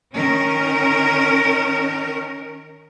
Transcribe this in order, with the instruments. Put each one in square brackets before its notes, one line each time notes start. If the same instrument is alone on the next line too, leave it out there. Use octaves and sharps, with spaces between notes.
[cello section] D#3 C#4 A#4